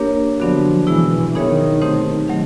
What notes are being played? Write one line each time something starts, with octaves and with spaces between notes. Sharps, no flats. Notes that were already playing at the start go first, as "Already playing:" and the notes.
Already playing: A#3 D4 G4 A#4 C#5
D3 F3 F#3 B3 D4 F#4
B2 E3 G#3 B3 E4 G#4
D#3 B3 D#4 G#4 C#5 E5
A3 C4 D#4 G4 C5
D#3 F#3 A3